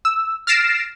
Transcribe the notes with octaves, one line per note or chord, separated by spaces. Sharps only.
E6
F6 A6 A#6 C7 D7 E7